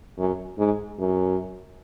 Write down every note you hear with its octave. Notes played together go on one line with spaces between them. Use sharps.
F#2
G#2
F#2